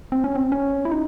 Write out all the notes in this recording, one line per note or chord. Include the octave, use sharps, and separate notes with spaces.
C4
C#4
C4
C#4
E4
D#4